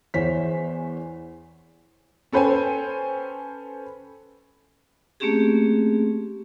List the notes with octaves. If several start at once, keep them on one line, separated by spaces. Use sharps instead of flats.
E2 E3 C5 C#5 B6
C#4 A4 B4 C5 G5 G#5
A3 A#3 C4 C#4 G4 G#4